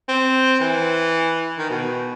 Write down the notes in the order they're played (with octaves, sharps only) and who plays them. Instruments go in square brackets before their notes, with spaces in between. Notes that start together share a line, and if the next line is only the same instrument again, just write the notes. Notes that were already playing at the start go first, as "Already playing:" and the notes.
[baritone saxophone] C4
E3
D#3
B2